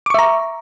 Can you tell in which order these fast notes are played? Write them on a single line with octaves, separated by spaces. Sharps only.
D6 C#6 E5 A#5